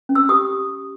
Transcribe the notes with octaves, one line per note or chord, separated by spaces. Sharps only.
C#4
E6
G4 D#6